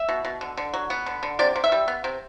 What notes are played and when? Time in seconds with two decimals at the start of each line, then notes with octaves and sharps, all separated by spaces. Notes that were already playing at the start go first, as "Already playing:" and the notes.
Already playing: E5
0.09 B2
0.25 B2
0.41 D3
0.57 D3
0.74 F#3
0.90 B3
1.06 D3
1.23 D3
1.39 C3 D5
1.56 C3
1.64 E5
1.72 G3
1.88 B3
2.04 C3